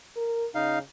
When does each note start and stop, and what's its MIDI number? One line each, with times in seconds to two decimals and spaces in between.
0.17 0.47 70
0.55 0.81 49
0.55 0.79 63
0.55 0.79 77